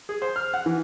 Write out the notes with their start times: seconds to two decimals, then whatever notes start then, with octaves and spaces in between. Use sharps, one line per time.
0.09 G#4
0.22 C5
0.36 F6
0.54 F#5
0.66 E3